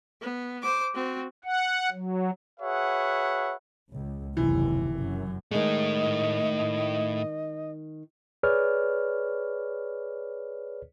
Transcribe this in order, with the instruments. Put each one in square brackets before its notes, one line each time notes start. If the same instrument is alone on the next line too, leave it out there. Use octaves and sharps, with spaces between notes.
[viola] B3
C5 D6
C4 F#4
[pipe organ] F#5
F#3
[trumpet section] F#4 G#4 B4 C#5 E5 F#5
[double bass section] C#2
[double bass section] F#1 D#2 C3 [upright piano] E3
[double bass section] F#2
[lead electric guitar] A2 A3 [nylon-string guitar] D#3 G#3 [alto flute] D#5
[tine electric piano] G#4 B4 C#5 D5 F6